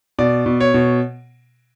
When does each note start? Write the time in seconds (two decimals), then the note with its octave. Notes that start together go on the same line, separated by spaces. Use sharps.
0.19 B2 D5
0.46 B2
0.60 C#5
0.74 B2